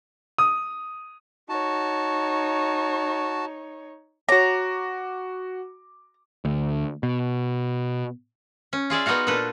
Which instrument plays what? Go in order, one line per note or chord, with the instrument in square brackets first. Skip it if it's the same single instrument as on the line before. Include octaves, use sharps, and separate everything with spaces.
[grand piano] D#6
[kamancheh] D#4 C#5 [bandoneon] F#4 A5
[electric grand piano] F#4 D6 [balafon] C#5 [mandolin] A#5
[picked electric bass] D2
B2
[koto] C#4
F4 G#4 D5 E5
B3 D#4 F4 F#4 F5
A#2 D4 A4 B4